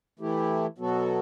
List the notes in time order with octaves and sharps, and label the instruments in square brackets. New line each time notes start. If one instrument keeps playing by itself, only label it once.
[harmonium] E3 A3 E4 G4
B2 F#3 B3 F#4 A4